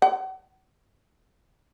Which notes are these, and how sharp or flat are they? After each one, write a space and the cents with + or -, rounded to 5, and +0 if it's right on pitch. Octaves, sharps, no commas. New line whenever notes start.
F#5 +35